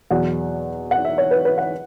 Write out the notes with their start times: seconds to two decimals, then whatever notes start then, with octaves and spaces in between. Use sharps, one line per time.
0.11 E2 B2 F#3 F#5
0.91 F#5
1.05 E5
1.18 C#5
1.31 B4
1.45 B4
1.58 F#5